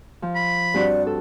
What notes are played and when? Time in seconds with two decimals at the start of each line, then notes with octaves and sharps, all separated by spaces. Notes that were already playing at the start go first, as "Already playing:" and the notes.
0.22 F3
0.36 B5
0.74 G2 C4 F#4 D5
1.07 A4